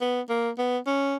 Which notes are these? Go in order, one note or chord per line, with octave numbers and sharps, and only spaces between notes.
B3
A#3
B3
C#4